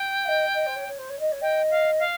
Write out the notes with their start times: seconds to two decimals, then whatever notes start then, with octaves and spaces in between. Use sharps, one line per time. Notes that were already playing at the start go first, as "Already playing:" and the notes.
Already playing: G5
0.24 F5
0.28 D#5
0.54 D#5
0.66 C5
0.75 C#5
0.88 C#5
0.98 C5
1.09 C#5
1.19 D#5
1.32 C#5
1.41 D#5 G5
1.70 F5
1.99 F5